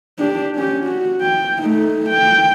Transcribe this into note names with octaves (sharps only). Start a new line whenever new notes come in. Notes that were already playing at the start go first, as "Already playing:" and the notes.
D4 G4
C#4 G4
F#4
G5
A3 D#4
G5